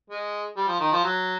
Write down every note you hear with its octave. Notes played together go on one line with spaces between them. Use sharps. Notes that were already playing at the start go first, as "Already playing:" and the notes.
G#3
G3
F3
D#3
F3
F#3